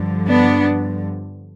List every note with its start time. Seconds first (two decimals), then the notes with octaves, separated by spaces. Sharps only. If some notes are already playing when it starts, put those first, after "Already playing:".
Already playing: G2 D3 F3
0.27 B3 D4